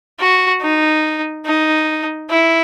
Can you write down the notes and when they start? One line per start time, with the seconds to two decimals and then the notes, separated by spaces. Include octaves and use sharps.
0.19 F#4
0.61 D#4
1.45 D#4
2.30 E4